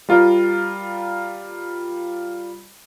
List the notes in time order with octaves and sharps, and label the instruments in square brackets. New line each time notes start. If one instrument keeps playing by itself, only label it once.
[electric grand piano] G3 F4 A#4